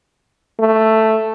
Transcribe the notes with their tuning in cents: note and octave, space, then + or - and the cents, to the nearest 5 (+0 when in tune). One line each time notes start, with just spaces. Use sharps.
A3 +5